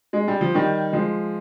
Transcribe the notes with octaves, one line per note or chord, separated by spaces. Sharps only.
G#3
G3
F3
D#3 G3
F3 G#3